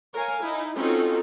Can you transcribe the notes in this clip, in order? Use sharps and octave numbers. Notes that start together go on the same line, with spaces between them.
A#4 C#5 F5 G#5
D#4 E4
C4 C#4 D#4 F4 F#4 A4